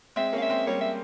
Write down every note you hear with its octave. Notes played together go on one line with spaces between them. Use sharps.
G#3 C4 E5
A#3 C#4 F5
E5
G#3 C4
G3 A#3 C#5
E5